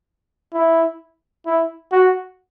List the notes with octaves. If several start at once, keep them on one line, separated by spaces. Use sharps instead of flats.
E4
E4
F#4